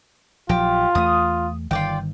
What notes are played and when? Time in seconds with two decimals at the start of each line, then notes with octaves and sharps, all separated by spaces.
0.49 A#1 F3 F#3 F4 G4
0.95 E2 A3 D#6
1.71 G1 D#3 F4 D5 G5